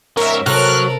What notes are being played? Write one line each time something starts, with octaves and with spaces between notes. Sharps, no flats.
G#2 C#4 A#4 E5
C3 F#3 A4 A#4 C#5 F6 F#6